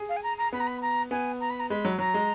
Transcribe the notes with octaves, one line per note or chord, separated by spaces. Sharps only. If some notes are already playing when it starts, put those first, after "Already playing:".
Already playing: G#4
F5
G#5
A#5
A#5
B3 B5
A#5
B5
A#5
B3 G#5
A#5
B5
A#5
G#3 B5
F#3
F#3 A#5
G#3